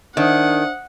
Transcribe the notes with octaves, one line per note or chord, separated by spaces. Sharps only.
D#3 D4 C5 E5 F#5 D#6